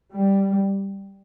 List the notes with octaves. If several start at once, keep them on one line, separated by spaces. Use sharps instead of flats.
G3